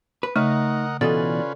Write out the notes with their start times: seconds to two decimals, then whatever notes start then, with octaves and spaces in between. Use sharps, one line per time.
0.23 B4
0.36 C#3 A3 D#4 A#4 D#5 F#5
1.01 B2 E3 C#4 F4 A4 B4 D5 D#5